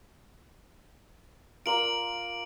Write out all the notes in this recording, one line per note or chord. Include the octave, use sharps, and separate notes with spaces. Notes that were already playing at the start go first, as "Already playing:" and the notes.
F4 A#4 D5 D7 F#7